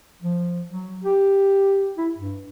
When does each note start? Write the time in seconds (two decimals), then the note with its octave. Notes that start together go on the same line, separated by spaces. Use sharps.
0.22 F3
0.68 F#3
1.04 G4
1.98 E4
2.15 G2